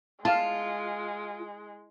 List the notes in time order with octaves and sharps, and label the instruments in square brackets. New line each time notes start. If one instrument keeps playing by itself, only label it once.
[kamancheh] G#3 [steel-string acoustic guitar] F4 [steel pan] F5 A5